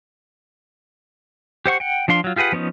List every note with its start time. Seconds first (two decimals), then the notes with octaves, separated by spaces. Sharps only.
1.66 G4 C5 F#5 C#6
1.80 F#5 G5
2.08 F3 D4 F5 C6
2.24 F#3 F4
2.36 F4 G4 G#4 B4 F#5
2.52 F3 B3 C#4 D#4